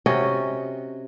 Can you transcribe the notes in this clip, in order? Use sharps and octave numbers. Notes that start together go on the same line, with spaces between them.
C3 C#4 F#4 D#5